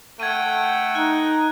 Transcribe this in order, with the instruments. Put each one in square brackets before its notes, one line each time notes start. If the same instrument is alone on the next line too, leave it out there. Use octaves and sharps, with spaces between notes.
[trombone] A3 [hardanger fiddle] F#5 G5 [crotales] G#6 D#7
[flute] D#4 [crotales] F#6